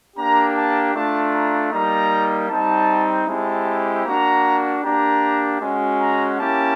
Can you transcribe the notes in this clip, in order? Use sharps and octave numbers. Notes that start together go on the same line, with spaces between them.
A#3 D4 G4 A#5
A5
A3 D4 F4 A5
A#5
G3 A#3 D#4 A#5
G3 C4 D#4 A5
G#3 C4 E4 G4 A5
A#3 D4 F#4 A#5
A#3 D4 G4 A#5
G#3 C#4 F#4
A#5
A#3 C#4 E4 G4 A5